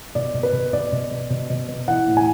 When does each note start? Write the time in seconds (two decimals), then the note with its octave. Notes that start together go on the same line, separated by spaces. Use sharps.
0.15 B2 D5
0.34 B2
0.43 B4
0.53 B2
0.73 B2 D5
0.92 B2
1.11 B2
1.30 B2
1.50 B2
1.69 B2
1.88 E3 F#5
2.07 A2
2.17 G#5